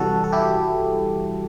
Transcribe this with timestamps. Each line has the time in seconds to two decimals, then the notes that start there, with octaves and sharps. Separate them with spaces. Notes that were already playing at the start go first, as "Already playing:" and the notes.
Already playing: C3 E3 G3 F#4 A4
0.24 A4
0.32 E4 G4